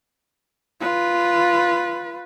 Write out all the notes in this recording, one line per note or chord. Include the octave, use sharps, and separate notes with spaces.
F4 B4